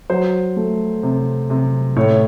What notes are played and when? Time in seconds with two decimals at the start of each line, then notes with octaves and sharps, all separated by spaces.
0.10 F#3 C5
0.57 A3
1.03 C3
1.50 C3
1.96 A2 C#5